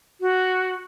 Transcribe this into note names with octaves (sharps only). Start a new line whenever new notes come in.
F#4